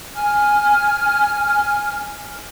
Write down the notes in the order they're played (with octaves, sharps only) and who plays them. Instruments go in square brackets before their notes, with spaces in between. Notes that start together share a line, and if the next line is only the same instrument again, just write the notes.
[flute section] G#5 F6